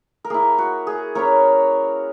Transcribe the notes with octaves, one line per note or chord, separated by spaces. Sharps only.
A#4
A#3 E4 G#4
F#4
G#4
A#3 C#4 E4 A#4 C#5